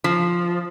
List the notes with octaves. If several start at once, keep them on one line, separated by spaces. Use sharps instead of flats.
F3